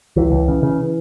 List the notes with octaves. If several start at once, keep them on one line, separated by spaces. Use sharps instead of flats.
C#2 E3
C#2
C#3
C#3